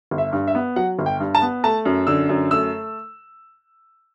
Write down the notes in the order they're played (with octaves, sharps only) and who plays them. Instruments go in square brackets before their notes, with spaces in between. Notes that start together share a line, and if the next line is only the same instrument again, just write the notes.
[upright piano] G1
E5
G2
E5
B3
F#3 F#5
G1
G5
G2
A5
B3
A3 A5
F#2
D3 E6
F#2
A3 E6